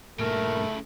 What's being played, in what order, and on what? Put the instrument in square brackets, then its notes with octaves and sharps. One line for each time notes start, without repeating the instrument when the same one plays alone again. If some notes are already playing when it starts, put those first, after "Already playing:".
[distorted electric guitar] G2 A#2 [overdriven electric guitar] C#3 E4 [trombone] A3 [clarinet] A#4